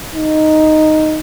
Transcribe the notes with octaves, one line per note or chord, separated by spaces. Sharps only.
D#4